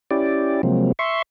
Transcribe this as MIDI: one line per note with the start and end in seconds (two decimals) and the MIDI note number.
0.11 0.61 61
0.11 0.61 64
0.11 0.61 67
0.11 0.61 74
0.63 0.92 48
0.63 0.92 53
0.63 0.92 54
0.63 0.92 56
0.63 0.92 58
0.63 0.92 60
0.99 1.22 76
0.99 1.22 84
0.99 1.22 85